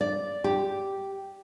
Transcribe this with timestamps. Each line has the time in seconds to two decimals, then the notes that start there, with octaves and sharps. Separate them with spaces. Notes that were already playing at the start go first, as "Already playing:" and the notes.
0.01 D5
0.44 G4